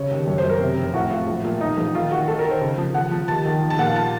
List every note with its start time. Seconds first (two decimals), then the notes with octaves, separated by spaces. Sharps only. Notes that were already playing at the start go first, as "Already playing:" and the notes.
Already playing: C#3 C#5
0.11 D#2
0.27 F#2 C#5
0.38 C5
0.44 F#2
0.49 A#4
0.61 C3
0.77 F1
0.94 A2 F#4
1.11 A2 F4
1.27 A#1
1.45 A#2
1.60 F3 D#4
1.78 A1
1.95 D#3 F4
2.11 D#3 F#4
2.28 D#3 A4
2.39 A#4
2.44 D#3
2.51 C5
2.61 C#3
2.78 F3
2.94 F3 F#5
3.11 F3
3.28 D#2 A5
3.45 D#3
3.62 F3
3.70 A5
3.78 A#2 F#5
3.87 F5
3.96 A5